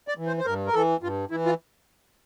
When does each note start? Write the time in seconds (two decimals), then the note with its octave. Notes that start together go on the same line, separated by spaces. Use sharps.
0.08 D5
0.18 E3
0.27 C5
0.38 C5
0.46 G2 A#4
0.67 A#4
0.74 E3 A4
1.02 G2 F4
1.31 E3 E4
1.46 F4